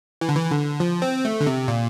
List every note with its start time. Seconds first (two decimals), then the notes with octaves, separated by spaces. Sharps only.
0.21 E3
0.29 D3
0.36 E3
0.51 D3
0.80 F3
1.02 C4
1.25 A3
1.41 D3
1.47 C3
1.68 A#2